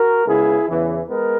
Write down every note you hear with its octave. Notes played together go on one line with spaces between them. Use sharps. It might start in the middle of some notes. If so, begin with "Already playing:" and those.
Already playing: F#4 A#4
C#2 C#3 G#3 B3 E4 G#4
E2 C#3 E3
G#3 B3 A#4